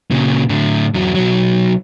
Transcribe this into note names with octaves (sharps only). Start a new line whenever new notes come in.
A#2 C#3
A2 D3
E2 F#3
B1 F#3